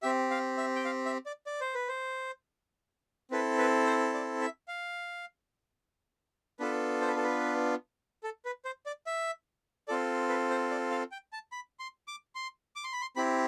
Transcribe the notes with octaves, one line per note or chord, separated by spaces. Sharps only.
C4 G4 E5
F5
E5
G5
F5
E5
D5
D5
C5
B4
C5
C4 E4 A4 B4
B4
C5
D5
E5
F5
B3 D4 F4 A4 B4
C5
B4
A4
B4
A4
B4
C5
D5
E5
C4 F4 A4 D5
B4
C5
D5
F5
G5
A5
B5
C6
D6
C6
D6
C6
B5
C6
C4 E4 G4 B5